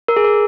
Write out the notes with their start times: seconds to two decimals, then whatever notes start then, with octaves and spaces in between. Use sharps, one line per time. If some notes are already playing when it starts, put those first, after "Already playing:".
0.08 A#4
0.16 G#4
0.24 A#4